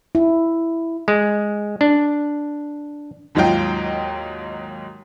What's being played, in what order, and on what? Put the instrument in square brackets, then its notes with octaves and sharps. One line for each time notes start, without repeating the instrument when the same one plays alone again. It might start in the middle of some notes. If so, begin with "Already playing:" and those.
[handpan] E4
[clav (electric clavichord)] G#3
D4
[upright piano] D#2 G#2 F#3 D#4 F4 G5